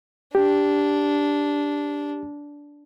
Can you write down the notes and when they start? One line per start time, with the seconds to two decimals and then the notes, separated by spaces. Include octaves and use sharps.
0.35 D4 G4